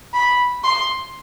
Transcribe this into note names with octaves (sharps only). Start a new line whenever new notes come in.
B5
C6